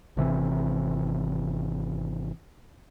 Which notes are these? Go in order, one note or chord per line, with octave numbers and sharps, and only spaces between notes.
G#1 C3 E3 C4